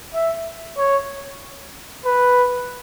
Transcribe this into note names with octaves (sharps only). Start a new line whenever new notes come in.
E5
C#5
B4